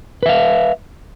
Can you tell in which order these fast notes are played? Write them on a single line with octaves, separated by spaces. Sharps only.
B4 E5 F5